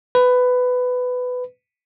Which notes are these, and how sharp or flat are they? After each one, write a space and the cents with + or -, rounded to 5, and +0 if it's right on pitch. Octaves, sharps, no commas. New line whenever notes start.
B4 +15